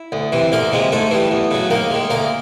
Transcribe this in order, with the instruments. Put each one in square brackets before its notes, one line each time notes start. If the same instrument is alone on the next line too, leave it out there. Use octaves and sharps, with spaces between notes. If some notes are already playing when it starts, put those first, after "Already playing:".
Already playing: [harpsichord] E4
D2
C3 E3
D2 A#3 A#4
C3 F3 G#3
G#2 A3 A4
E3 G3
E2
C#3 F#3
D#2 A#3 A#4
D#3 G#3
D2 A#3 A#4